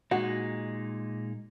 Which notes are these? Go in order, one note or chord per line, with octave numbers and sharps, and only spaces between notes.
A#2 G#3 D#4 F#4